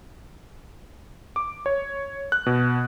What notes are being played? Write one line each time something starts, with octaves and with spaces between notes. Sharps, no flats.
D6
C#5
F#6
B2